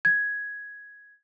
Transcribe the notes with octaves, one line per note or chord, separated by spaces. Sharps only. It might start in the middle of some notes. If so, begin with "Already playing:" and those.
G#6